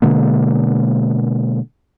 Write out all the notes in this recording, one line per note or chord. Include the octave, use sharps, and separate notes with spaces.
B2 D3 G#3 A#3